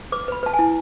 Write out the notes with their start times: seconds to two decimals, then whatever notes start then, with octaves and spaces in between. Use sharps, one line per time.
0.12 B4 D6
0.28 B4 B5
0.43 B4 A5
0.53 G#5
0.59 E4